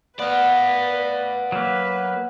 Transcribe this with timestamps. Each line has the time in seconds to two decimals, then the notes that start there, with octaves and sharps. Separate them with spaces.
0.19 B3 B4 D5 F5
1.52 F#3 A#3 B4